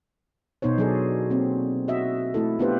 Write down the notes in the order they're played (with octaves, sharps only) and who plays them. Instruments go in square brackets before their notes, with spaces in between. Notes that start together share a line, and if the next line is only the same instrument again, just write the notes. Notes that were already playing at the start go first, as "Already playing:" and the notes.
[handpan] B2 B3 D#4 C5 C#5
F#3 D4 F#4 G#4 A4 D5
A#3 C4
F#4 D#5 E5
A3 E4 A4
B3 D4 F4 G4 B4 C5